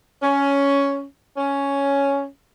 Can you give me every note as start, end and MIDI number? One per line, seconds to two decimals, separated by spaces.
0.22 1.03 61
1.37 2.26 61